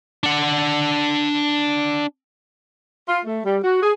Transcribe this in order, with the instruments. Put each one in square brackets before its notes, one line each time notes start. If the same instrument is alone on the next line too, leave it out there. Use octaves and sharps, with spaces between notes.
[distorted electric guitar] D4 F#5
[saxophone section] F4
A3
G3
F#4
G#4